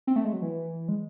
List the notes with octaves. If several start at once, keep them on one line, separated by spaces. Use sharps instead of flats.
C4
A3
G#3
F#3
E3
G#3